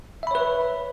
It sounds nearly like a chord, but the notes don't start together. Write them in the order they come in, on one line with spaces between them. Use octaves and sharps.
E5 B5 C#5 B4